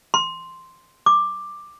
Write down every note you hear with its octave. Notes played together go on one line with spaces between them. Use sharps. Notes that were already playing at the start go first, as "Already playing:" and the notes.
C6
D6